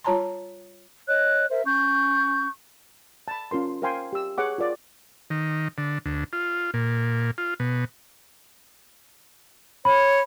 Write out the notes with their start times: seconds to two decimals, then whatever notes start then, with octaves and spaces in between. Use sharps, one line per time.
0.04 G3 F4 C#5 A5 A#5 C6
1.08 C#5 D#5 F#6
1.50 A#4 C5 E5
1.65 C#4 C#6 G6
3.28 A5 B5
3.51 C#4 F4 A#4 C6
3.82 A#4 C5 F5 G5 G#5 C6
4.13 G4 E6
4.38 G#4 C#5 F#5 D6
4.58 F4 A#4 D5
5.30 D#3
5.78 D3
6.06 D2
6.33 F4
6.74 A#2
7.38 F4
7.60 B2
9.85 C#5 B5